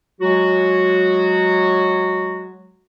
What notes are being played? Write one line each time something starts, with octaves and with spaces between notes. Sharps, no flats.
F#3 G#3 F#4